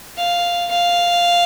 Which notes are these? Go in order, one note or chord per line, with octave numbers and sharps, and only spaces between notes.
F5
F5